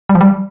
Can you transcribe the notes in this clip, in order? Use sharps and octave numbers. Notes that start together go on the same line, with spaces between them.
G3
F3
G3